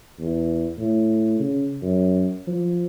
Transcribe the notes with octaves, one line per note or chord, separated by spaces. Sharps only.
E2
A2
C#3
F#2
F3